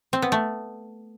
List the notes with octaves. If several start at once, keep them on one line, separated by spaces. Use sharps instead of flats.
C4
B3
A3